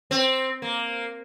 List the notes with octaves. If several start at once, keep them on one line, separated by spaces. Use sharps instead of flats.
C4
A#3